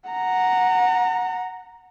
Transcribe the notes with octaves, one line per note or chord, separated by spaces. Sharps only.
F#5 A#5